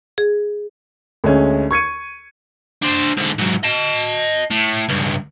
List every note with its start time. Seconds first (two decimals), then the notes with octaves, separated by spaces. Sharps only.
0.18 G#4
1.24 D2 G#3 C#4 G#5
1.71 C#6 G#6 C#7 D#7
2.82 D4 C5
3.17 G#2 D3
3.38 G#2 F#3
3.63 D#5 A5
4.50 A2
4.89 C#2 G2